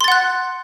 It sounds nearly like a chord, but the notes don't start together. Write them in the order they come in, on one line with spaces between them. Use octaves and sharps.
C6 A6 F#5 F#6